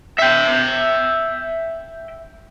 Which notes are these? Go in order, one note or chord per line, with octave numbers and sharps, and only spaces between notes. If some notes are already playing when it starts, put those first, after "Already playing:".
E5 G5